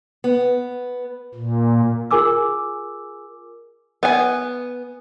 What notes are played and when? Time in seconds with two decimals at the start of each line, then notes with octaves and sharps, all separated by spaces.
0.24 B3
1.35 A#2
2.11 F4 G#4 A#4 G#5 D6 E6
4.03 B3 G#5